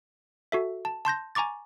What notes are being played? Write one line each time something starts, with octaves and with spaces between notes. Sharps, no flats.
F#4 A4 E5
A5
A5 C6 G6 A#6
G#5 A#5 C#6 D6 A6